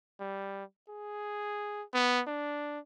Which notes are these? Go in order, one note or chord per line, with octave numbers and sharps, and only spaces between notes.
G3
G#4
B3
D4